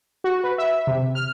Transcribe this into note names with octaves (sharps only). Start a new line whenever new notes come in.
F#4
B4
E5
C3
F6